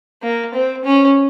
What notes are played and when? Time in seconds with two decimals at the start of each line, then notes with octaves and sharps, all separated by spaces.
0.22 A#3
0.54 C4
0.85 C#4